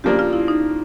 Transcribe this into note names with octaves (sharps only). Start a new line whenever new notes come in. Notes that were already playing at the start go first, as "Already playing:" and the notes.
C#3 F3 A#3 D4 G4
F4
E4
D#4